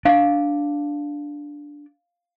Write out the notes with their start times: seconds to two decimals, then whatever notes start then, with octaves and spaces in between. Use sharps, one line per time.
0.05 D4 F5